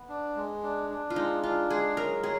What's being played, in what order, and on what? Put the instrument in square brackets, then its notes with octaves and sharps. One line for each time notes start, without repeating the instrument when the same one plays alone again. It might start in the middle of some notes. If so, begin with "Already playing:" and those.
Already playing: [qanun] B3
[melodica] D4
G#3
D4
D4
[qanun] F4
[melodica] G#3 [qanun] D#4
[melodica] D4 [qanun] F4
[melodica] G#3 [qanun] G#4
[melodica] F#3 [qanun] A#4
[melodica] F#3 [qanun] G#4